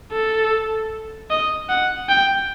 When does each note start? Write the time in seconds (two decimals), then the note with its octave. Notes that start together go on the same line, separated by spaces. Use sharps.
0.12 A4
1.30 D#5
1.69 F#5
2.09 G5